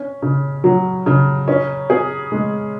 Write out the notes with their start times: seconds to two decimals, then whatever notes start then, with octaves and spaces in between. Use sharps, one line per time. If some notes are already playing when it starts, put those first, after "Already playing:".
Already playing: C#4
0.22 C#3
0.64 F#3
1.06 C#3
1.48 C#4
1.90 G#4
2.32 G#3